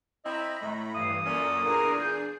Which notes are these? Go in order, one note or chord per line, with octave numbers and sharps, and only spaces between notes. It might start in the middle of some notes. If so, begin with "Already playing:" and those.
C4 E4 D#5 A#5 B5
A2 A3
G2 E3 F5 D#6
F#2 A#2 A#3 C#4 A4 D5
E2 A#2 D4 G#4 A#4 C7
G6